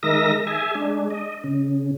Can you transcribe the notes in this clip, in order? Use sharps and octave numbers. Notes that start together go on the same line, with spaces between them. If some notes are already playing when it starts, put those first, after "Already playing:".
D#3 G#3 A#4 D#5 E5 A#6
G#4 E5 G#5
G#3 D4
D#5
C#3